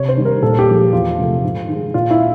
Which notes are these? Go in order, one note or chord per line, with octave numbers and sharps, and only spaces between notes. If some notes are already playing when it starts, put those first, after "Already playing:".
Already playing: C3 C#5
C5
D#3 G3
A#4
A#2 A4
G4
F3 G#3
E2 F4
C3 F3 A3
G#2
D#3 G#3
A#2 F4
E4